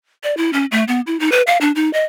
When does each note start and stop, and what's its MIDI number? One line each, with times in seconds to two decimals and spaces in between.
0.24 0.37 74
0.37 0.53 64
0.53 0.66 61
0.72 0.84 57
0.88 1.01 59
1.07 1.19 64
1.20 1.31 63
1.32 1.42 71
1.47 1.58 77
1.61 1.72 62
1.75 1.92 63
1.93 2.04 75